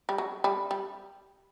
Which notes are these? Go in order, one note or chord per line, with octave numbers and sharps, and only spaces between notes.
G3
F#3
G3
G3